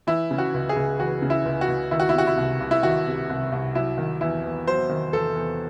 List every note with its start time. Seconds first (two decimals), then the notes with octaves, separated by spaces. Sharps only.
0.07 E3 E4
0.31 C#3
0.38 F#4
0.54 C#2
0.69 G#4
0.76 C#2
1.00 E3 F#4
1.22 C#3
1.30 E4
1.45 C#2
1.61 F#4
1.68 C#2
1.91 D#3 E4
2.00 F#4
2.09 E4
2.14 C3 F#4
2.27 E4
2.37 C2
2.60 C2
2.71 E4
2.83 D#3 F#4
3.07 C3
3.30 C2
3.52 C2
3.75 F#3 E4
3.98 D#3
4.21 E2 E4
4.44 E2
4.67 F#3 C5
4.89 D#3
5.13 E2 A4
5.36 E2